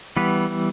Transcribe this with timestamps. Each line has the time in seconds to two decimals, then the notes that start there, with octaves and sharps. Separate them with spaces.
0.17 E3 G3 B3 B4